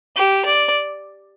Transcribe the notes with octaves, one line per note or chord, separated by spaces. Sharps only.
G4
D5